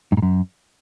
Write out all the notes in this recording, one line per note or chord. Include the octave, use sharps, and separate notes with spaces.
G2
G#2
F#2